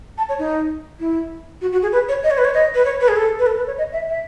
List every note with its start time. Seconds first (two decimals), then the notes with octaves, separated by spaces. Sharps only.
0.18 A5
0.29 C#5
0.39 D#4
1.00 E4
1.61 F#4
1.72 F#4
1.82 G#4
1.92 B4
2.09 C#5
2.23 D#5
2.31 C#5
2.38 B4
2.45 C#5
2.54 D#5
2.75 B4
2.85 C#5
3.00 B4
3.08 G#4
3.16 A4
3.39 B4
3.46 A4
3.57 B4
3.67 C#5
3.78 D#5
3.93 E5
4.08 E5